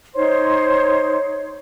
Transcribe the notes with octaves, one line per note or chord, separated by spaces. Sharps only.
D#4 C5 C#5 C6